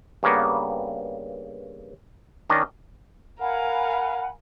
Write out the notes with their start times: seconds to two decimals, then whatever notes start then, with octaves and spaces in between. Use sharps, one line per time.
0.23 G2 C#3 A#3 B3
2.50 D#3 C#4 D4 D#5
3.40 A#4 F5 F#5 G#5 B5